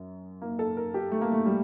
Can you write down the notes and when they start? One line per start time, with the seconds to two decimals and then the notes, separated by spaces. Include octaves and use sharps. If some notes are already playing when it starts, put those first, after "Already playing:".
Already playing: F#2
0.42 A#3
0.59 A4
0.77 A#4
0.94 G4
1.12 A3
1.21 A#3
1.32 A3
1.46 G3